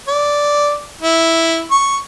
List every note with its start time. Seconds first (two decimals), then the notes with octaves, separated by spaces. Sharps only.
0.08 D5
1.01 E4
1.71 C#6